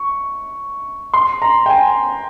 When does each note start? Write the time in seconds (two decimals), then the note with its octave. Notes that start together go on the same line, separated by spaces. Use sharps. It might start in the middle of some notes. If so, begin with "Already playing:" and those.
Already playing: C#6
1.14 C6
1.42 A#5
1.66 G5
1.70 G#5